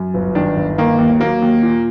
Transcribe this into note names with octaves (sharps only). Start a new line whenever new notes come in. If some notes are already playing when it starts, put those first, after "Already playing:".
Already playing: F#2
G1
D#3 D4
G1
D#3 A#3
D#2
F#3 A#3
D#2
A#2